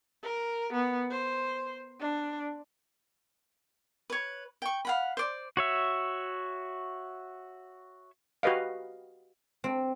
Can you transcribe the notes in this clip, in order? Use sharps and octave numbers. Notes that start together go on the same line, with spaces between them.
A#4
B3
C5
D4
B4 C#5
G5 C#6
F5 F#5 B5
C5 D5
F#4 C#5 E5
F#4 G4 B4 D#5 F5
C4